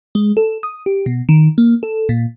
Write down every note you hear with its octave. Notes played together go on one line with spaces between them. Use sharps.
G#3
A4
D#6
G4
B2
D#3
A#3
A4
A#2